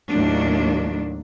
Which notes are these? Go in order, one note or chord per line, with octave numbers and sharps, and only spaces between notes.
D#2 A2 F#3 A#3 D4